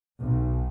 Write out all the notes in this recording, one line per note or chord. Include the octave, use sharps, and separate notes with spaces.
B1